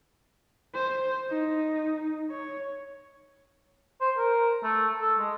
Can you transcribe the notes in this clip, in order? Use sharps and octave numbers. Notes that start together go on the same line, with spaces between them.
C5
D#4
C#5
C5
A#4
A3
A4
G#3